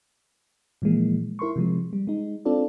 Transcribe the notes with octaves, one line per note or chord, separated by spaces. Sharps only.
A#2 E3 F3 G#3 A#3
E4 A#4 C6 C#6
C3 F3 G#3
G3
G#3 D#4
C4 D4 F4 A4 D5